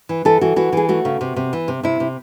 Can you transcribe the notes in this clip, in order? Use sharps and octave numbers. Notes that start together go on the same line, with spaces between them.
E3
E3 A4
E3 F#4
E3 F#4
E3 G#4
A3 F#4
C#3
C3
C3
E3
C3
C3 E4
C3